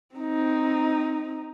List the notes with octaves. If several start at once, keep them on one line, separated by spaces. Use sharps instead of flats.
C4 D#4